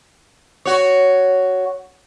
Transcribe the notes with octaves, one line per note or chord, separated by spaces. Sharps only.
F#4 C#5